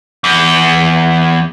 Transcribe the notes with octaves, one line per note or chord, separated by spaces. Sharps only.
E2